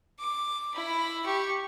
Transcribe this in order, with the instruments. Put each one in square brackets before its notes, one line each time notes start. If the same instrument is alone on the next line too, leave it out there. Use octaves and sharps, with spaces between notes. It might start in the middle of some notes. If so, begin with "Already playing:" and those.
[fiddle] D6
E4 B5
G4 C#6